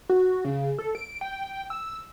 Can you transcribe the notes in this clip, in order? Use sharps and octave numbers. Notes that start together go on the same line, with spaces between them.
F#4
C#3
A4
D7
G5
E6